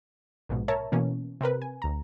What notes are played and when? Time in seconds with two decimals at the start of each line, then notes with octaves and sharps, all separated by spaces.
0.49 A#1 G#2 B2
0.68 A#4 C#5 E5 A5 A#5
0.92 B2 E3 A#3 C#4
1.41 C3 C4 A#4 B4
1.62 G#5
1.82 D2 A#5